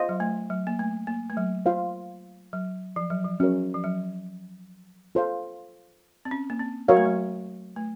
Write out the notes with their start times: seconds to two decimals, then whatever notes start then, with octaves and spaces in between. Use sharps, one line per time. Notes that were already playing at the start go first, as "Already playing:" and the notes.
Already playing: F4 C5 D#5
0.09 F#3
0.20 A3
0.50 F#3
0.67 A#3
0.79 A3
1.07 A#3
1.30 A3
1.37 F#3
1.66 F4 C5 F5
2.53 F#3
2.96 F3
3.10 F#3
3.24 F3
3.40 F#3 C#4 F#4 A#4 C#5
3.74 F3
3.84 F#3
5.15 F4 A4 C5 F5
6.25 C4
6.31 C#4
6.50 A#3
6.60 C4
6.88 F#3 F#4 A#4 C#5 F5
6.97 A3
7.06 F#3
7.76 A3